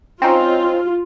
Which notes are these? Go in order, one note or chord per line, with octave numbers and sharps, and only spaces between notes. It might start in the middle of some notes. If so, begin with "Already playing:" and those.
C4 C#4 D#4 F4